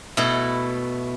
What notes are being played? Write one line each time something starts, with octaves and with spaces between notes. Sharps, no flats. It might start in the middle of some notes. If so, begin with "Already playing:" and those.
B2 A3 E4